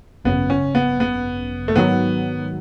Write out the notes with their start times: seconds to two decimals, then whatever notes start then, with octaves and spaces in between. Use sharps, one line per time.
0.25 G#1 F#2 C#3 B3
0.50 C#4
0.75 B3
1.00 B3
1.68 A3
1.76 G#2 D#3 F#3 B3